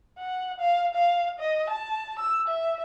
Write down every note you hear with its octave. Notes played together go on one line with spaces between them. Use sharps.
F#5
F5
F5
D#5
A5
E6
E5